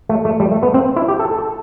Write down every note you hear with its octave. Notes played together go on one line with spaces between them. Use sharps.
A3
A3
G3
A3
B3
C4
E4
G4
A4
A4